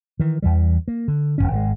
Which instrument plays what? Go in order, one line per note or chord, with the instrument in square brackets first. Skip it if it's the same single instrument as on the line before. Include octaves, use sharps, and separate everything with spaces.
[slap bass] D#3 E3
E2 E3 G3
A#3
D3
D#1 F2 C#4
G#1 D3 G#3